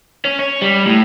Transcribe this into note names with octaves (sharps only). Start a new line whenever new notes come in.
C#4
C#5
G3
A2